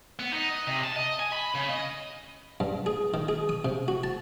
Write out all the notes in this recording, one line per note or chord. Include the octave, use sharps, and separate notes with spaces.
B3
D#4
D#5
C3
A5
D#5
G#5
B5
C#3
D#5
G2
G#4
D#3
G#4
D#6
C3
F#4
A5